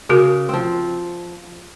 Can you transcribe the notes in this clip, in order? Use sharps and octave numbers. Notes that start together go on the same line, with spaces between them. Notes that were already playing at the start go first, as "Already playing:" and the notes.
C#3 F#4 A#4
F3 C4